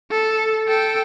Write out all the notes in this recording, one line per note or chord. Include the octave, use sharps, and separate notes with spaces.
A4
A4 G5